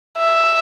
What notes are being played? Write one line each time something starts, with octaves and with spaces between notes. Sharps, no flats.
E5